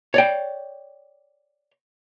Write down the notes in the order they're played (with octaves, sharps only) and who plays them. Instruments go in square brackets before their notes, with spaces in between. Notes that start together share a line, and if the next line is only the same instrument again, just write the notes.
[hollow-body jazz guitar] C#5 D5 G5